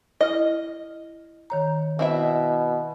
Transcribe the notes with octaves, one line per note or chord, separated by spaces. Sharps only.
E4 D#5 F6
D#3 C#5 A#5
B2 C4 E4 D#5 E5